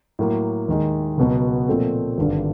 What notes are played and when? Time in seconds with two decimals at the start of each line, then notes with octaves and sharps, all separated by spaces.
0.19 A2 F#3 A#3
0.68 D#2 D#3 G#3
1.18 C#2 B2 F#3 B3
1.68 A#2 F3 A3 C4
2.18 G#1 G2 D3